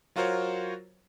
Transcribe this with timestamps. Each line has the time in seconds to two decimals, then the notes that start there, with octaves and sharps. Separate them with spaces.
0.16 F#3 F4 F#4 A#4 C5 C#5